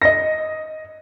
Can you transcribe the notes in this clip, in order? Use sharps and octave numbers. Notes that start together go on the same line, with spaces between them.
D#5 A#6